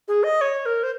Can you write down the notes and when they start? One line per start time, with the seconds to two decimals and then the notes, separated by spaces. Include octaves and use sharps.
0.08 G#4
0.24 D#5
0.41 C#5
0.66 A#4
0.83 C5